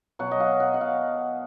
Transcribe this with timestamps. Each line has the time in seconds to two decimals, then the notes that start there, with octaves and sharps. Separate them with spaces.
0.19 B2 F#3 F#5
0.31 D#5
0.40 F5
0.60 F#5
0.74 F#5
0.81 F5